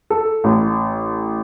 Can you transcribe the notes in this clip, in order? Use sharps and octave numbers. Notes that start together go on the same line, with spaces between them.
A4
A1